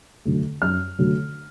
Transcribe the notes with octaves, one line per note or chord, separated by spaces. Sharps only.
D3 F#3 A3
F#2 F6
D3 F#3 A3